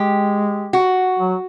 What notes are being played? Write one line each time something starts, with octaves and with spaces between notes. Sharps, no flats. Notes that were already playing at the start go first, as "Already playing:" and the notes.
Already playing: G#3 G4
F#4
F#3